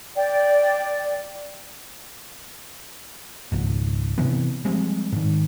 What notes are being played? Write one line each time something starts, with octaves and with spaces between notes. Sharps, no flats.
D5 G5
G#1 C#2 G#2
C3 E3 B3
F3 G3 G#3 C4
G#2 D#3